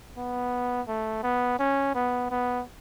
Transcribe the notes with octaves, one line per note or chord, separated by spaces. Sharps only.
B3
A3
B3
C#4
B3
B3